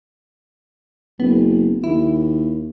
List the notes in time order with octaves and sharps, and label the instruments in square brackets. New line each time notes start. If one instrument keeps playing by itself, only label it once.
[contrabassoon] F#1 [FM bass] B3
[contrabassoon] D#2 [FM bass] E4